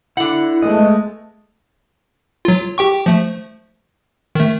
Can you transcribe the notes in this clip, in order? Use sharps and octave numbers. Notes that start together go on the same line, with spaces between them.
D3 E4 F#5
G#3 A3 B3 D#5
F#3 F4
G4 G5 C#6
F3 A3
D#3 A3